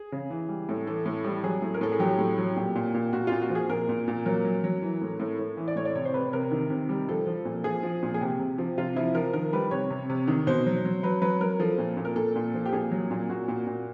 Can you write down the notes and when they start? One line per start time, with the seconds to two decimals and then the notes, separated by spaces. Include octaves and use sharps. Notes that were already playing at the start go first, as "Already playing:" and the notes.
Already playing: G#4
0.12 C#3
0.30 E3
0.49 G3
0.69 A2
0.87 E3 A4
1.06 A2
1.24 G3
1.43 F#3 G#4
1.62 A2
1.74 A#4
1.81 A2 A4
1.92 G#4
1.99 F#3 G4
2.19 A2
2.38 F#3
2.56 A#2 G4
2.75 A#2
2.94 A#2
3.13 A#2 F#4
3.27 A#2 F4
3.42 F#4
3.50 F3
3.55 G#4
3.70 A#2 A#4
3.89 A#2
4.08 A#2
4.26 F#3 A#4
4.45 F#3
4.64 F#3
4.82 E3
5.02 A2
5.20 A2
5.39 A2
5.57 E3
5.68 D5
5.76 A2 C#5
5.85 D5
5.95 C3 C#5
6.05 C5
6.14 C3 B4
6.33 C3 A#4
6.51 D#3
6.70 C3
6.89 G3
7.09 F3 A4
7.27 F3
7.45 A#2
7.64 F3 G#4
7.83 F3
8.03 A#2
8.14 G#4
8.20 C3 G4
8.39 C3
8.58 F3
8.78 C3 F4
8.96 F3 E4
9.15 F3 A#4
9.33 D#3 A#4
9.53 G3 B4
9.71 C3 C#5
9.90 C3
10.10 C3
10.28 D#3
10.47 B2 C5
10.66 F#3
10.85 F#3
11.03 F#3 B4
11.22 F#3 B4
11.41 F#3 A#4
11.60 F3 A4
11.78 A#2
11.97 A#2
12.05 A#4
12.16 A#2 A4
12.36 A#2
12.54 F3
12.66 G4
12.73 A#2 G#4
12.91 F#3
13.11 A#2
13.29 A#2 F#4
13.48 A#2
13.67 A#2